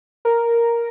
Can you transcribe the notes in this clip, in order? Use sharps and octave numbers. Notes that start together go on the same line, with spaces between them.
A#4